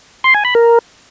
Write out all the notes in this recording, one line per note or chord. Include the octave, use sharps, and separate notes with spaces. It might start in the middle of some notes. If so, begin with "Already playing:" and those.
C6
G#5
B5
A#4